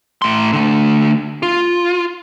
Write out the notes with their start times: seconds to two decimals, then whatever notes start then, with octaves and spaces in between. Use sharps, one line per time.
0.22 A2 C6
0.53 D3 A3
1.43 F4